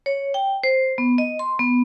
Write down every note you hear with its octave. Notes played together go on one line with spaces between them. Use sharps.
C#5
G5
C5
B3
D#5
C6
B3